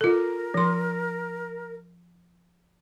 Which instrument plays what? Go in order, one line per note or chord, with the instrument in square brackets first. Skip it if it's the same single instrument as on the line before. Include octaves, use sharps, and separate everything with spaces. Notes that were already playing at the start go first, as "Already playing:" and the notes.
[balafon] F4 A4 [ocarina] A#4
[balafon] F3 C6